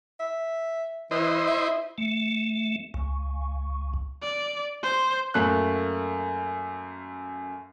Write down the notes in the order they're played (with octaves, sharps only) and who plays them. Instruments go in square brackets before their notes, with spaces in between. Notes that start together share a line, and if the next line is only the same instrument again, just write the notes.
[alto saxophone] E5
[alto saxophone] E3 [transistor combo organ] E4 C5 D#5
[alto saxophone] E5
[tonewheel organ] A3
C#2
[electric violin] D5
C5
[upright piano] F#2 A3 A#3 F#6